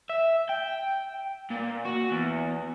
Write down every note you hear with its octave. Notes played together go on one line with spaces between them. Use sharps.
E5
G5
A#2
F#4
E2